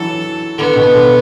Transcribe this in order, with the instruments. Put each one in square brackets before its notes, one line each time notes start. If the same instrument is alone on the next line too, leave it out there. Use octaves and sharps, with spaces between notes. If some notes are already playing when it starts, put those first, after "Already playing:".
Already playing: [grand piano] E3 F#3 [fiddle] A4
[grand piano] D3 [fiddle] B3
[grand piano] B2
D3